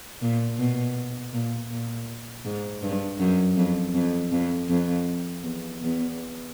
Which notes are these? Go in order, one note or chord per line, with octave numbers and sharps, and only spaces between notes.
A#2
B2
A#2
A#2
G#2
G2
F#2
F2
F2
F2
F2
E2
E2